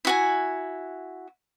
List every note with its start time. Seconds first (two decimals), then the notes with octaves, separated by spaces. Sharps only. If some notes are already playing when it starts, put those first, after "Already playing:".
0.05 E4 F#4 G#5